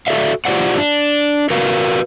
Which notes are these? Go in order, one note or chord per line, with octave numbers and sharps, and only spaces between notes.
F#4 A4 D5 E5 F5
F4 G4 A4 C5 D5 F#5
D4
F#4 A#4 B4 F5